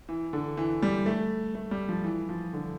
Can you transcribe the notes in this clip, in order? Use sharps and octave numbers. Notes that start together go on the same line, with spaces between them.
E3
D3
E3
G3
A3
A3
G3
F3
E3
F3
D3